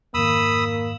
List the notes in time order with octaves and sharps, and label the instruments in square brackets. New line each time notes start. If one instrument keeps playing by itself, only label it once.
[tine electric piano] F2 G#2 D#3 [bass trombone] A#3 [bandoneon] B5 D#6 E6